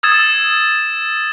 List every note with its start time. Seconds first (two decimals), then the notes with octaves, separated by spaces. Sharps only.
0.03 D#6 E6 G#6 A6 E7